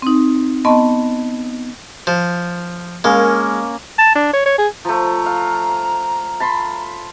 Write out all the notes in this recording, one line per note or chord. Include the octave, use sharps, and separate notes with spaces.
C4 D#4
B3 D#5 A5 C6 C#6
F3
G#3 A#3 C#4
A5
D4
C#5
C#5
G#4
F3 A3 A#5
F5
A5 B5 C6